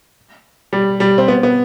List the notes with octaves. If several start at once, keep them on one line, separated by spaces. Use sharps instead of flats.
G3
G3
C4
B3
B3